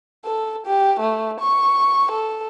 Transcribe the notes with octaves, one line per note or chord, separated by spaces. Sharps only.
A4
G4
A3
C#6
A4